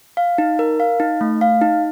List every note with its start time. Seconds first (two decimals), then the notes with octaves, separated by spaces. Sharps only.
0.17 F5
0.38 D#4
0.59 A#4
0.80 F5
1.00 D#4
1.21 A3
1.41 F5
1.62 D#4